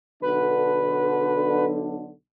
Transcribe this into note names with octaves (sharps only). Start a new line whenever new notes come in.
B1 D3 B4